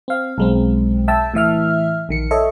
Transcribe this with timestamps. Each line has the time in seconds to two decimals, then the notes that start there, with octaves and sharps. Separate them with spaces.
0.08 C4 F5
0.38 B1 G#3 C4
1.08 E5 G5 A5 E6
1.34 A2 E3 E5 F6
2.09 A#1 D#3 C#7
2.31 A4 C#5 D#5 E5